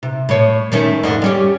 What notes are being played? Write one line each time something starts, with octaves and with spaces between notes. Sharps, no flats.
C3
A2 C#5
D#3 A3 C#4
F2 G#2 D3
G3 C#4 G4